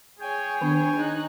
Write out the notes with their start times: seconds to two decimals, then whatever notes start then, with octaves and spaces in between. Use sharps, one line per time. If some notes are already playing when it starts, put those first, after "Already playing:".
0.20 G#4 C#5 G5 G#5
0.61 D#3 B3 D4
0.96 D#4 F#6